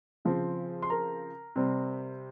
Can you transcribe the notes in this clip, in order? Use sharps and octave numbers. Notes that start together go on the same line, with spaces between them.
C#3 F3 C4
C6
A#4 A#5
C3 G3 C4